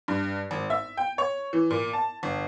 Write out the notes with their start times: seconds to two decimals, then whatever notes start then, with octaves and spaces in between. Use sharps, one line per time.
0.08 G2
0.51 G#1
0.70 E5
0.97 G5
1.18 C#5
1.53 E3
1.71 A#2
1.93 A5
2.23 G1